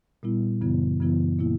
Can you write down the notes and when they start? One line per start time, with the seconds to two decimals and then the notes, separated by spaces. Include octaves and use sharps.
0.23 A#2 G3 B3 E4
0.61 F#2 C#3 E3 B3 E4
1.00 F#2 C#3 E3 B3 E4
1.38 A#2 A#3 E4